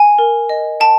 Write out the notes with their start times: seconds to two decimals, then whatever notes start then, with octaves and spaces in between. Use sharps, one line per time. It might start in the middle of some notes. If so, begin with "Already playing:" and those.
Already playing: G#5
0.19 A#4
0.49 D#5
0.80 G5 A5